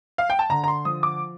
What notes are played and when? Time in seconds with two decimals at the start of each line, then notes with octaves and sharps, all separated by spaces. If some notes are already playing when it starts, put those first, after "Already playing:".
0.18 F5
0.30 G5
0.39 A5
0.50 D3 A#5
0.64 A#5
0.68 C6
0.85 F3 D#6
1.03 D6